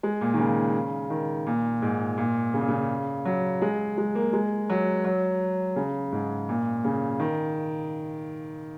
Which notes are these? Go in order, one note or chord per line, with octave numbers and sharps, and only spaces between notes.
G#3
A#2
D#3
C#3
D#3
A#2
G#2
A#2
C#3
A#2
C#3
F#3
G#3
G#3
A#3
G#3
F#3
F#3
C#3
G#2
A#2
C#3
D#3